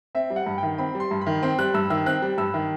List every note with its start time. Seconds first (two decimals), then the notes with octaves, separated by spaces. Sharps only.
0.15 C4 E5
0.30 G3
0.36 F#5
0.46 G2
0.58 D#3 G5
0.78 C4 B5
0.95 G3
1.00 C6
1.11 G2
1.21 B5
1.26 D#3
1.42 C4 C6
1.59 G3 F#6
1.74 G2 E6
1.90 D#3 E6
2.06 C4 F#6
2.22 G3
2.38 G2 E6
2.54 D#3